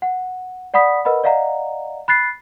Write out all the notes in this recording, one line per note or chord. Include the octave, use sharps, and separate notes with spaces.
F#5
D5 F#5 B5 D#6 B6
A#4 B4 D#5 F#5 B5
D5 D#5 F5 F#5 A#5
B5 F#6 A6 C7